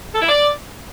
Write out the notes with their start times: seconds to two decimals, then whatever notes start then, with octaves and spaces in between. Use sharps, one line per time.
0.14 A4
0.21 E4
0.29 D5